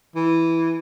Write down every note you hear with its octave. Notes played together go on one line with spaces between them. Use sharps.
E3